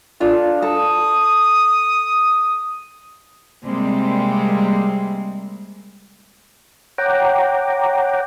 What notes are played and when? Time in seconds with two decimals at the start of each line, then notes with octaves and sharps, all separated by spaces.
0.20 D4 F4 A4
0.62 A4 D#6
3.64 C3 G3 G#3 A#3 C4
6.98 C#5 F#5 G5 A#5 D6